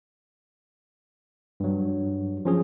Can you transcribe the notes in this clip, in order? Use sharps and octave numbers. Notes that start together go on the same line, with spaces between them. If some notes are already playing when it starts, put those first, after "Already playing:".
G2 F#3
F3 C#4 G#4